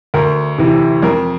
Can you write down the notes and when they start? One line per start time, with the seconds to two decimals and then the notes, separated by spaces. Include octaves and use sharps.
0.14 D2 A#4
0.58 C3 E3
1.03 F2 A#4